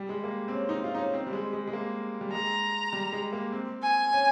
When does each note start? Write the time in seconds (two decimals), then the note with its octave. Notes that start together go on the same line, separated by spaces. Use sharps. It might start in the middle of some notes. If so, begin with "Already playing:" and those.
Already playing: G3
0.09 G#3
0.24 A#3
0.48 C4
0.53 C#4
0.69 D#4
0.84 F4
0.94 D#4
0.98 C#4
1.14 C4
1.26 G3
1.33 G#3
1.53 G#3
1.67 G#3
1.73 A#3
2.21 G3
2.32 G#3 A#5
2.93 G3
3.13 G#3
3.33 A#3
3.52 C4
3.82 G#5
4.13 C#4